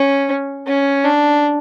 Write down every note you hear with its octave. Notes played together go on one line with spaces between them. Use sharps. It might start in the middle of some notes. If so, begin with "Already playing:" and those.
Already playing: C#4
C#4
D4